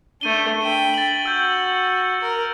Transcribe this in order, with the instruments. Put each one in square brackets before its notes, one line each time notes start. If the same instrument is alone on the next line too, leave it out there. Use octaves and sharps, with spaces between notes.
[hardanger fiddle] A3 D4 [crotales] G6 D#7 G7
[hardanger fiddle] G5 B5
[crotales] A6 F#7
[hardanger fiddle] F#4 [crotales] E6 G6
[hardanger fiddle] A#4